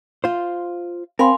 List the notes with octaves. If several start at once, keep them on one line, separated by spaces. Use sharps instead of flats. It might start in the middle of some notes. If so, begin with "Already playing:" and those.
F4 C5
C4 A#4 F5 G#5 B5 C6